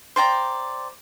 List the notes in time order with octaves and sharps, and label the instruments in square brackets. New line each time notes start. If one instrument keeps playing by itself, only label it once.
[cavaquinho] C5 D5 G5 A#5